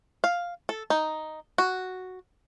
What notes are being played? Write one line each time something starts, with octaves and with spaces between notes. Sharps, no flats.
F5
A4
D#4
F#4